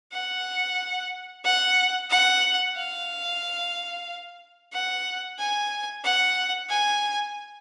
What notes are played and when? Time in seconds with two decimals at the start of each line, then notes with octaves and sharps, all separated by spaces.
0.12 F#5
1.44 F#5
2.10 F#5
2.76 F5
4.73 F#5
5.39 G#5
6.04 F#5
6.69 G#5